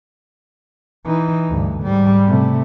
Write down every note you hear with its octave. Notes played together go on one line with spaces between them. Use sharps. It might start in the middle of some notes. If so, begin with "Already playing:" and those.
E3 D#4
D2 G2
G#2 G3
C3 A3